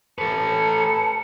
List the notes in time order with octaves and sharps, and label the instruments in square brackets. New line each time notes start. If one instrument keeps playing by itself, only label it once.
[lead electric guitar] A4 B4 [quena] A5 [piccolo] C#7